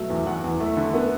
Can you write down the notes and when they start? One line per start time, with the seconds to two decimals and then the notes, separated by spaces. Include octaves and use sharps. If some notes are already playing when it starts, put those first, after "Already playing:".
Already playing: B2 F#3 A3
0.10 E2
0.26 E2 F#5
0.44 E2
0.60 A3
0.77 D3
0.94 B3